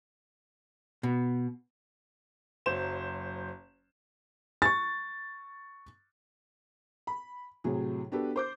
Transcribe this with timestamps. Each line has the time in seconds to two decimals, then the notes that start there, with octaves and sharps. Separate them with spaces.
1.03 B2
2.66 F#1 F#3 C5 E7
4.62 C#6 A6
7.07 B5
7.64 A2 C3 F#3 G#4
8.12 B3 D4 F#4 G4 A4 B4
8.36 C5 D6 G6